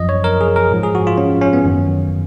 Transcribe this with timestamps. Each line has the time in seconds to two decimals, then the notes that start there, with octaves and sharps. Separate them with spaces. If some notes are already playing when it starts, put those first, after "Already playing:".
Already playing: F#2 F3 D#5
0.09 C#5
0.24 A#4
0.41 G#4
0.56 A#4
0.72 G#2 F3
0.83 G#4
0.95 F#4
1.07 F4
1.18 C#4
1.42 C#4
1.53 B3
1.65 F#2 D#3